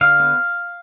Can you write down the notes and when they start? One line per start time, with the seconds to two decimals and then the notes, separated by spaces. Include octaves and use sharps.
0.01 D3 F5
0.20 B3